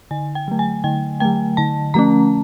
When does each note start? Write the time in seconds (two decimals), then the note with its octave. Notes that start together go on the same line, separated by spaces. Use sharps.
0.11 D3 G#5
0.35 G5
0.48 F#3 A3
0.59 G#5
0.84 D3 G5
1.20 F#3 A3 G5
1.57 D3 A5
1.94 F3 A3 C#4 A#5